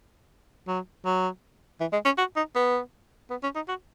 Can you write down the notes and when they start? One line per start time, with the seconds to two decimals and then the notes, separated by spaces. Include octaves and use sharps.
0.68 F#3
1.05 F#3
1.80 E3
1.93 G#3
2.05 C#4
2.18 F#4
2.36 D#4
2.56 B3
3.30 B3
3.43 C#4
3.55 D#4
3.68 F#4